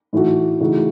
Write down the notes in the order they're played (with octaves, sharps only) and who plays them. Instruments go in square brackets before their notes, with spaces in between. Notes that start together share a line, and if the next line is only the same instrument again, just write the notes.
[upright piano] A2 E3 A3 D#4 F#4
C#3 E3 A3 D#4 F#4